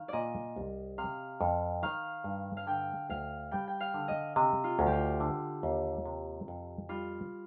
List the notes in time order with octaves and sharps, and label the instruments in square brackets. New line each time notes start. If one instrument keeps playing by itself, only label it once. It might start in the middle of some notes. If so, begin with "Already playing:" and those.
Already playing: [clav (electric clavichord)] D#3 [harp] F5
[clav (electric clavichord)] A#2 [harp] D5 D#5
[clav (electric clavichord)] C2
[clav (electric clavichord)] C3 [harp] F5
[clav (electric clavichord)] F2
[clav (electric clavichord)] D#3 [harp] F5
[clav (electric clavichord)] G2
[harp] F5
[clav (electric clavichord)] D3 [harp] G5
[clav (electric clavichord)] D2 [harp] F5
[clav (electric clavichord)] G3 [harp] G5
[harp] G5
F5
[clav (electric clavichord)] D3
[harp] D#5
[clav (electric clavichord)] C3 [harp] D#5
[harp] F4
[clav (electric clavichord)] D2
[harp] G4
F4
[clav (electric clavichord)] D3
D#2
C3
F2
[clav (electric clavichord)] G3 [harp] F4